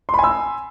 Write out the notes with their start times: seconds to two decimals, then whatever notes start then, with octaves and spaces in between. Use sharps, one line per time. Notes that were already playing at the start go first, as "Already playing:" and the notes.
0.09 C6
0.14 B5
0.19 G#5
0.24 E6